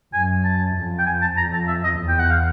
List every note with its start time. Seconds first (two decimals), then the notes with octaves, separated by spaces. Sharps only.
0.13 F#2 G#5
0.44 A5
0.76 F2
0.99 G5
1.06 G#5
1.21 A5
1.37 F2 A#5
1.53 A5
1.68 E5
1.84 D#5
2.00 E2
2.08 G5
2.19 F#5
2.30 F5